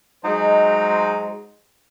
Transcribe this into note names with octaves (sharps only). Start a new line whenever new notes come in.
F#3 G#3 D#4 C5